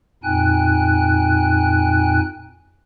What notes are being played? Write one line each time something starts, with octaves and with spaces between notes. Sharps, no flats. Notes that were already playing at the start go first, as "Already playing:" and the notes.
F2 A#2 D#4 G5 G#5 F#6